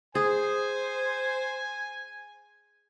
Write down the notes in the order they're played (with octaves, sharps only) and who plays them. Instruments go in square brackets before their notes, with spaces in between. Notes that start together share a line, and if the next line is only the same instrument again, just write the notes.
[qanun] G#4 [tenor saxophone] C5 [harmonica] G#5